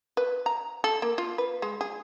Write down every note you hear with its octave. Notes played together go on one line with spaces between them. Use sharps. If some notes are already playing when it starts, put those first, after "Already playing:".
B4
A#5
A4
A#3
F4
B4
G#3
G#4